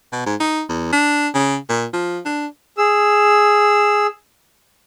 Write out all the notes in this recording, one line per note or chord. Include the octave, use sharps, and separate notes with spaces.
B2
G#2
D#4
E2
D4
C#3
A#2
F3
D4
G#4 E6